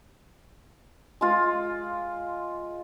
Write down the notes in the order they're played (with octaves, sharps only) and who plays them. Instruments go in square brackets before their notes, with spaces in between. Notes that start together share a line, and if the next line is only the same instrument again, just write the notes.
[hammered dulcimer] G#3 F4